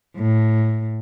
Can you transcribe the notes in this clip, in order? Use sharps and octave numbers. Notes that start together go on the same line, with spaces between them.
A2